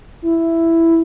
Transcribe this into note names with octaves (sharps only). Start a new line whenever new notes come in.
E4